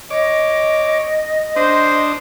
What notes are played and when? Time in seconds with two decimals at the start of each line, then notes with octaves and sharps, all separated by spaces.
0.10 C#5 D#5 D6
1.56 D4 C5 D#6